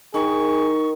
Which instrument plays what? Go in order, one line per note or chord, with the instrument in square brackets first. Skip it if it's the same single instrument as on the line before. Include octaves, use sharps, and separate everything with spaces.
[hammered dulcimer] D#3 [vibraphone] D#4 [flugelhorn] G#4 [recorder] C#6